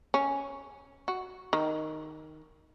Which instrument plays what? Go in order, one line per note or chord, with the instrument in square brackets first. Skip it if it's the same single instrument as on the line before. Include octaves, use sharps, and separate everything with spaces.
[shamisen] C#4
F#4
D#3